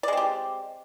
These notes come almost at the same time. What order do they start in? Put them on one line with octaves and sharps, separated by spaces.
D5 G#3 C4 G4